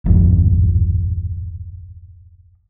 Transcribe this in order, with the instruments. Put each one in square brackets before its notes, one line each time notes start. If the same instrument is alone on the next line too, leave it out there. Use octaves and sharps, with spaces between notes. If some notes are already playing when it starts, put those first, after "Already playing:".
[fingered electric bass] D1 G#1 F2